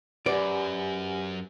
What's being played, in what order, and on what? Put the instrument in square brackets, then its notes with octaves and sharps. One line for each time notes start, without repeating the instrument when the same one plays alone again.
[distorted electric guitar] F#2 [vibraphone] G4 F#5 G#5 [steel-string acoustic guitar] B4 [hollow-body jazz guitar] D5